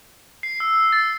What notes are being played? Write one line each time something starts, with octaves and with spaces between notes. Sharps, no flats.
C7
E6
A6